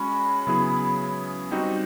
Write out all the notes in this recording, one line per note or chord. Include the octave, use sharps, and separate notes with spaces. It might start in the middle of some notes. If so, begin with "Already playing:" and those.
Already playing: G#3 C#4 F#4 B5
C#3 F#3 B3 E4 G#4
G3 C4 D#4 F#4